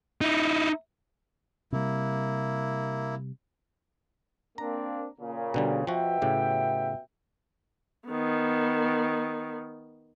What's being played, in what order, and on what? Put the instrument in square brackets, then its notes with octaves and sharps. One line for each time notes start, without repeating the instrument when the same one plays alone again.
[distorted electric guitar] D#4 E4
[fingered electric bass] C3 G3 [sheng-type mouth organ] A#3 E4
[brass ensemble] A#3 C4 D4 [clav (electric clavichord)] A#5
[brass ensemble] A#2 C#3
[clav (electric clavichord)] B2 D3 G3
[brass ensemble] B2 E5 G5 [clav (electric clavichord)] F3 F#4
[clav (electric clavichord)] A2 C#3 G4
[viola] D#3 B3